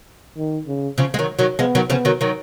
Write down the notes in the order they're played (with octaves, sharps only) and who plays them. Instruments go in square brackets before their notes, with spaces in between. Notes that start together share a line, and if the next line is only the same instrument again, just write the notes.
[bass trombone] D#3
C#3
[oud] C#3 F3
G#3
D#3 F#3
D#3 F#3
[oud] F3 G#3 [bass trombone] B3
[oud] D#3 F#3
[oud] C#3 F3 [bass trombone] B3
[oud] D#3 F#3
D#3 F#3